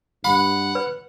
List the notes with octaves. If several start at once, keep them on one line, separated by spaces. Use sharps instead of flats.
G2 F#5 B5
B4